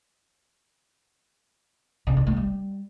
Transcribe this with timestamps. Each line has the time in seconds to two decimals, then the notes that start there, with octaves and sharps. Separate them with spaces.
2.07 C#3
2.17 D#3
2.27 A3
2.36 G3